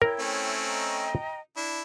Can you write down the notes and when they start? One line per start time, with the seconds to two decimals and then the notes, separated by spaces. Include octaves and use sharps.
0.02 E4 A#4 C#5 G5
0.19 A3 C4 C#4
0.67 D#5 G5 A#5
1.57 D4 E4